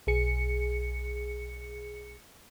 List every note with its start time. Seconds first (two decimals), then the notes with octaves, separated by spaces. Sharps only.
0.07 B1 G#4 C#7